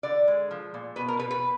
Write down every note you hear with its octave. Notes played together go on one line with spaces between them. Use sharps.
D3 D5
G#3
F3
A#2
B2 B4
A#4
B2 B4
B4